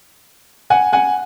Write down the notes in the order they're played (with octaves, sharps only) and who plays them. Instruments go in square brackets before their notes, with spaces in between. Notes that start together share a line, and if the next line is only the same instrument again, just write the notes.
[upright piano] F#5 G#5
F#5 G#5